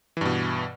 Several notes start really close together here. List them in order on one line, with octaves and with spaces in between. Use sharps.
E3 G2 B2